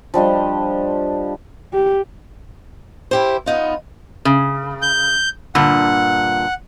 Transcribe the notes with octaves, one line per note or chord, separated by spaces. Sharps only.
F3 G3 D4 D#5
G4
E4 G4 C5
B3 D#4 F4
C#3
G6
G2 A#2 D3 F#5